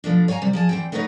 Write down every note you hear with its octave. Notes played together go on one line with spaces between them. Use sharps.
B2 F3 A3 D4
C#5 F5 G5 G#5 A#5
C3 G3
F3 G#4 A5
E2 C4 G5
A3 B3 D#4 B4 C#5 D#5